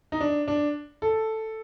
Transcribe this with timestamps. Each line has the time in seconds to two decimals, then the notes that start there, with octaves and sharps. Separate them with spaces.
0.12 D#4
0.21 D4
0.48 D4
1.02 A4